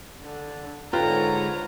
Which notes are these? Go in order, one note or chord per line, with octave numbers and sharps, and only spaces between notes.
D3
G#2 D3 F4 B4 C#5 G5 A#5